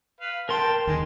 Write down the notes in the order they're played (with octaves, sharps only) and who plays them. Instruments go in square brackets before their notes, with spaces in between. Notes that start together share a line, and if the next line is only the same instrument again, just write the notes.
[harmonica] B4 F5
[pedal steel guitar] A#4 C6 [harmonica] G5 A5
[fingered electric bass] D#2 D#3 [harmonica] G#3